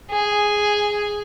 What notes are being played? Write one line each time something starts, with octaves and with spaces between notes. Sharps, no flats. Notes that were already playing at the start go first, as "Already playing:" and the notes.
G#4